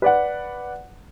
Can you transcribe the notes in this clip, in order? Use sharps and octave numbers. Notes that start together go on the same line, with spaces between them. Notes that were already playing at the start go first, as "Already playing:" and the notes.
B4 D5 F#5